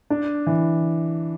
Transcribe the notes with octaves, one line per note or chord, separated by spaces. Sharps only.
D4
E3